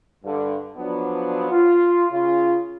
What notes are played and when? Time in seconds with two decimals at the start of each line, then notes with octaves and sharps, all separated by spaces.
0.25 G2 D3
0.76 F3 F#3 B3 D4
1.51 F4
2.11 C#3 F4